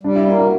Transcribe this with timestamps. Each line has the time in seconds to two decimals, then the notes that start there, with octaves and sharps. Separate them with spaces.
0.03 G3 D4
0.16 E4
0.27 A#3 D4
0.39 F#4